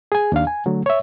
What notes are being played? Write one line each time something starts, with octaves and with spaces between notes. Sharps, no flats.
G#4 G#5
D#2 D4 F5
G#5
D3 F#3 A3
C#5 E5